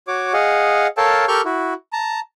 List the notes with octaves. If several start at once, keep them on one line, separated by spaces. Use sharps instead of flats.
F#4 C#5 D6
G#4 D#5 F5 F#5
A4 A#4 C#5 F5 G5 A5
G4 A4 A#4 C#6 F6 G6
E4 F#4
A5 A#5